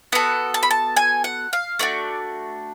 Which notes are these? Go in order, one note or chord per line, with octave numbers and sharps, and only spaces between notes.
B3 F#4 A4 F#5
A5
B5
A5
G#5
F#5
F5
A3 D4 F#4 D5